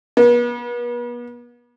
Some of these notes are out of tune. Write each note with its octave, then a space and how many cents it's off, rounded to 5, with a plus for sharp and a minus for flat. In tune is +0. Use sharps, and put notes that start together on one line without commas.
B3 -40